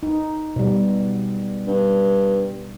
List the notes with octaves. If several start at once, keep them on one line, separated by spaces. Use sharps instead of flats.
D#4
B2 G3
G2